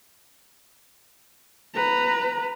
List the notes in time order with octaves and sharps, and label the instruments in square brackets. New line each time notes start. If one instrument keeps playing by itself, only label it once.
[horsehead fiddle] B4 A#5